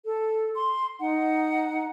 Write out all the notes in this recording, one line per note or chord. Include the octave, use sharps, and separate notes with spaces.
A4
C6
D#4 F#5